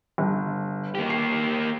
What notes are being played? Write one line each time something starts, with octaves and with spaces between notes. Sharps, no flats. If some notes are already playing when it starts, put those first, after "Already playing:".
G1
A#3 G4
C7